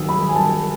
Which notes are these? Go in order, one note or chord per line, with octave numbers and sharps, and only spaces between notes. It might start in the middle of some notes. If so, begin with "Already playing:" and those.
Already playing: D#3 F#3 D#6 E6
B5
G#5
A5